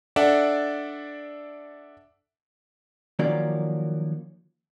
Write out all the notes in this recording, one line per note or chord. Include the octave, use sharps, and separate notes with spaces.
D4 A4 D5 E5 F#5
D#3 F3 F#3 A#3 C#4 D5